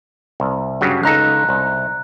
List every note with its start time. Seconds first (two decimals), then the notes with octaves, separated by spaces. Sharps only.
0.40 C2
0.81 G2 C#3 F#3
1.03 C#2 D#4 A4 A#5 F#6
1.49 C2